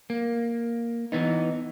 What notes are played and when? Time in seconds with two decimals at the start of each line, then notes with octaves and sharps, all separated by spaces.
0.10 A#3
1.12 E3 B3 D#4